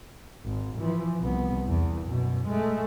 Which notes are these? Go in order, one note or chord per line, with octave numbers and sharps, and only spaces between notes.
G#1
E3 F3
C2 B3
E2
F#2 B2
G#3 A3